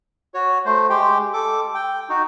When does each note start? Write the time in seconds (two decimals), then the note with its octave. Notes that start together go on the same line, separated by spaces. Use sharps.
0.34 F#4 C#5
0.65 A3 C5
0.90 G#3 G4 G5
1.33 A4 D6
1.74 G5
2.09 D#4 F#4